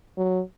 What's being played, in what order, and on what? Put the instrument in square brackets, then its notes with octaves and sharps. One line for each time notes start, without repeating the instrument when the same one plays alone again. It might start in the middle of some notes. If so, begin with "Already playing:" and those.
[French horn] F#3